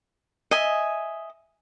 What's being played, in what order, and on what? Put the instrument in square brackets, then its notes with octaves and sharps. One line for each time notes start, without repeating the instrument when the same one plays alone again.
[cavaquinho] D#5 E5 G#5